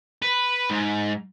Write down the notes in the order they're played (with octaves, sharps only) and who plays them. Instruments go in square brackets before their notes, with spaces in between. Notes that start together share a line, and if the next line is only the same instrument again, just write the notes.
[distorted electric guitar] B4
G#2